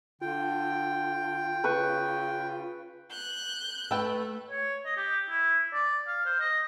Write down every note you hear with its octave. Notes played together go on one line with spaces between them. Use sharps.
D3 F4 G5
C#3 B4 C#6
F#6 G6
A3 A4 B4 G5
C#5
D#5
G4
E4
D5
F5
C5
D#5